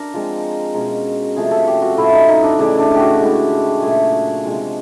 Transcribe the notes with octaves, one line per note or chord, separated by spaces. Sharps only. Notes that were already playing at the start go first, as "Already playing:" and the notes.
Already playing: D4 A#4
F3 G#3 C4
B2 G#3 C#4 A#4
C3 F3 A3 C#4 G#4
A4
G4
F#4
A2 F3 A3 E4
D#4
D#4
D4
C#3 E3 A3 D4
D4
F#4 G4
A2 E3 G#3 G4
A#2 F#3 A3 G#4
C3 F3 G#3